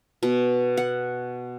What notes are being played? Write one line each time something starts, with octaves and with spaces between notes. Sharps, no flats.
B2
F#5